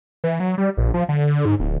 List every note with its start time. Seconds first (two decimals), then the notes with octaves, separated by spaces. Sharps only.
0.24 E3
0.40 F#3
0.58 G3
0.77 A#1
0.94 F3
1.09 D3
1.45 G#2
1.60 D1